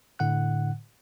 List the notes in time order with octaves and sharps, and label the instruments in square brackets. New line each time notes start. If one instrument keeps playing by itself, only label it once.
[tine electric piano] A2 D3 F#5 F#6